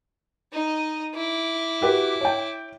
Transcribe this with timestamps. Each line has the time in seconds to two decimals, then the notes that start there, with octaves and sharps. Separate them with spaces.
0.53 D#4 D#5
1.15 E4 D6
1.81 F#4 G4 B4
2.21 C#5 G5